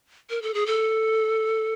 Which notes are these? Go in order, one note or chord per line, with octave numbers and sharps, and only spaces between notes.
A#4
A4
G#4
A4